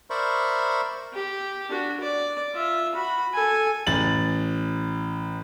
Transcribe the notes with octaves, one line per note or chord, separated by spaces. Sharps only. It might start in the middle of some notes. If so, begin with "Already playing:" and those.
A#4 C5 D5 E5 B5 C#6
G4
D4 F#4
D5
F4 E5
F#4 B5
A4 G#5
A1 A6 F#7